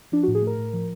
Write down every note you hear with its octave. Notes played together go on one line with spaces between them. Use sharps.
F3 D4
F#4
A2
G#4
A3 A#4
A2
F3